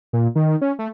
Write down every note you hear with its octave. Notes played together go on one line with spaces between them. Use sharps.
A#2
D#3
C#4
A3